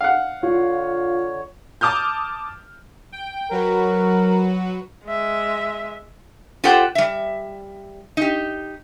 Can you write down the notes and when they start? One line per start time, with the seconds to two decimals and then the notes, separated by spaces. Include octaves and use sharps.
0.01 F5 F#5
0.43 D3 F4 C#5
1.81 A5 D6 D#6 F6 G6
3.12 G5
3.51 F#3 F#4 A#4 B4
5.06 G#3 E5
6.64 F4 G4 A4 C5 F#5 G5
6.95 G3 E5
8.17 D#4 G4